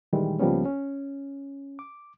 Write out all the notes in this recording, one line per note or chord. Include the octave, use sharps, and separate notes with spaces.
A#2 D#3 E3 G3 G#3
C#2 F3 G3 A#3 B3 C#4
C#4
D6